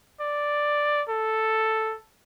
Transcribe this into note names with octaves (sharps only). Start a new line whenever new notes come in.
D5
A4